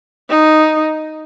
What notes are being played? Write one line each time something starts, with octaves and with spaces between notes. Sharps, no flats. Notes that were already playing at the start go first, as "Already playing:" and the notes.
D#4